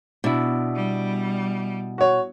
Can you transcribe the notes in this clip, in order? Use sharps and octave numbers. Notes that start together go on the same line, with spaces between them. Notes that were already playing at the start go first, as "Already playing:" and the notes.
B2 D4 E4
G3
F#4 C#5